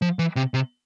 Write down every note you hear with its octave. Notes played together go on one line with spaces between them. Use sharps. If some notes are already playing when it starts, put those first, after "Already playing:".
F3
E3
C3
C3